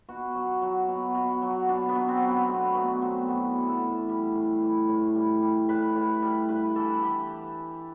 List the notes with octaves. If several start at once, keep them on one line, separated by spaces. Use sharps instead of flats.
B2 F#4
F#3
F#3
B2
B2
F#3
B2 D4
B3
F#3
C4
F#3
B3
B2 A3
B2 B3
F#3 C4
A2 B3
E3
A4
A2
G3 G4
A2
E3
A2
G3
G3
A2 B4
A2
G3
G2 B4
E3 A4
G4